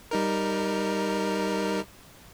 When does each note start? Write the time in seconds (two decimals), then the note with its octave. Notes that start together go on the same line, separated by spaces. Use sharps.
0.11 G3 D#4 A#4